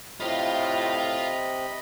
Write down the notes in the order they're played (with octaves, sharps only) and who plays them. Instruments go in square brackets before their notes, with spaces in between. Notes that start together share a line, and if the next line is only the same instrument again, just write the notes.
[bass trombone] A2 [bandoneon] C3 [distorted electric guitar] F4 F5 [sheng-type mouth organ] D#5 B5